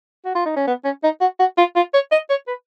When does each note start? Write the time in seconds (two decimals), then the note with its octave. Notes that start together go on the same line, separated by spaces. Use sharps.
0.25 F#4
0.35 F4
0.46 D#4
0.56 C#4
0.67 B3
0.85 C#4
1.03 D#4
1.21 F#4
1.39 F#4
1.58 F4
1.76 F4
1.94 C#5
2.12 D#5
2.30 C#5
2.47 B4